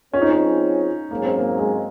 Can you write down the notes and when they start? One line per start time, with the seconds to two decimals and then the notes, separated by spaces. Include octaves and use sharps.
0.14 F#3 C4 C#4 F4 G#4 C#5
0.22 D#4
0.31 C#4
1.10 G#2 F#3 A#3 C#4 G#4
1.24 C4
1.38 A#3
1.59 G#3